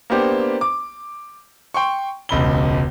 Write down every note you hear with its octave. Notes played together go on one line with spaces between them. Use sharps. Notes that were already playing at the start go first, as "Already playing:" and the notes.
A#3 B3 D4 G4 C5
D6
G5 C6 C#6
E1 C#2 B5 G7